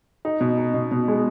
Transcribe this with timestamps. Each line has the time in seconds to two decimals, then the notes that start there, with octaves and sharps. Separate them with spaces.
0.25 D#4
0.41 B2
0.58 D#4
0.74 B2
0.91 B2
1.08 G#3